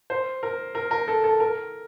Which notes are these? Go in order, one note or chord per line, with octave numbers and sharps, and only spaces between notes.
C5
A#4
A#4
A#4
A4
A4
A#4